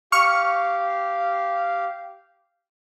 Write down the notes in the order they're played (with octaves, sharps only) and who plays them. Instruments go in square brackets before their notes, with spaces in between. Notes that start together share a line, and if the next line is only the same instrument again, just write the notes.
[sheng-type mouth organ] G4 F5 [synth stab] C#6 F6 C#7